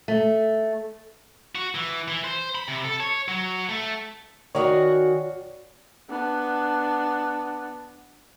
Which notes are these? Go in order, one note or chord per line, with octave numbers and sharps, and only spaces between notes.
A3
F#4
E3
E3
C5
B5
C3
A4
C#5
F#3
A3
D#3 F#4 G#4 C#5 D5
B3 D4